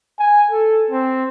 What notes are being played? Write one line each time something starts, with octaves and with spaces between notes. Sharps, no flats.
G#5
A4
C4